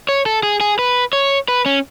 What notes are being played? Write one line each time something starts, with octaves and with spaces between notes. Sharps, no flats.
C#5
A4
G#4
G#4
B4
C#5
B4
C#4